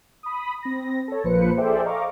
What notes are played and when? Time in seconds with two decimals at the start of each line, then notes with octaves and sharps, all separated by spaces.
0.23 B5 D#6
0.63 C4 A#6
1.08 A4 C#5
1.24 A#1 F3 A#3 B4 C5 C#7
1.57 G#4 A4 C5 D5 E5 G5
1.85 D#5 F5 A#5 C#6 D6